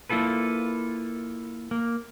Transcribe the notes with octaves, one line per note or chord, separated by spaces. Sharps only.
A#3 E4 F4 A4 B4
A#3